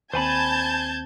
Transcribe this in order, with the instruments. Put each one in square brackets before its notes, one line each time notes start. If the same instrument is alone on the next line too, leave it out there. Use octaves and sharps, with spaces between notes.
[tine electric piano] D#2 C4 [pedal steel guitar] C5 G#5 B5 [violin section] A5 G6 G#6